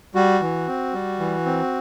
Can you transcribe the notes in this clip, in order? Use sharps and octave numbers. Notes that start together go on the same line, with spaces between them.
G3 F#4
E3
C4
G3
E3
C4